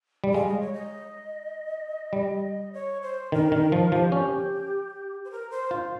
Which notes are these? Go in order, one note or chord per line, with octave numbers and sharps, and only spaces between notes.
G3
G#3 F5
D#5
C#5
D#5
G3
C#5
C5
D#3 A#4
D#3
F3
F3 G4
C#4
C5
A#4
C5
F4